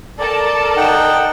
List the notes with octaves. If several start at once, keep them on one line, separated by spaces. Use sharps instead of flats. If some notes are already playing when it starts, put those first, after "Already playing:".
A4 A#4 D5 A5
D#4 F#5 G5